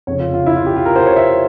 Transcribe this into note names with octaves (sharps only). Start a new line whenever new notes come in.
F1 F2 C#3 C#5
F4
F4
E4
F4
G4
F4
A#4
C5
C#5
E5